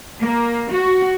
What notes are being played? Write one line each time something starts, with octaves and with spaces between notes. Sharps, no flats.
A#3
F#4